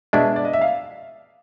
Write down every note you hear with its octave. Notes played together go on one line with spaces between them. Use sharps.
B2 G#3 B3 D4 E5
D5
D#5
E5
F5